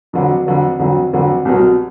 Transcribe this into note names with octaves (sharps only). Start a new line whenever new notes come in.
F2 D3 F#3
F2 D3 F#3
F2 D3 F#3
F2 D3 F#3
C2 B2 F#3